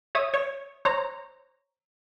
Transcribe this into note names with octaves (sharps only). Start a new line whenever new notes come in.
C#5 E5 D#6
C#5
C5 C#5 A#5